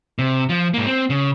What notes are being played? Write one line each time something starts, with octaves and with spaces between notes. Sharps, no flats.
C3
F3
G#2 A#3
C4
C#3